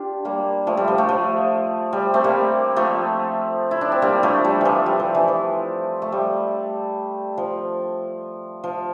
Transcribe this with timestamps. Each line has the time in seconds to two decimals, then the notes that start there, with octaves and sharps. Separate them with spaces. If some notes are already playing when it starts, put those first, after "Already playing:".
Already playing: D4 F4 G4
0.25 G3 A#3
0.67 F3 A3
0.77 G3
0.88 F3
0.98 F3 A3
1.09 F3
1.93 G3
2.14 A3 C4
2.24 G3 A#3
2.76 F3 A3
3.71 E4
3.81 D4
3.92 C4
4.02 G3 A#3
4.23 F3 A3
4.45 G3
4.61 E3 F3
4.86 G3
5.00 F3
5.15 E3
5.28 F3
6.02 A3
6.12 G3
7.38 F3
8.64 F3